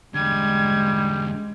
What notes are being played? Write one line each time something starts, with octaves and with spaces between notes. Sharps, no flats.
E2 D3 G3 G#3 G#6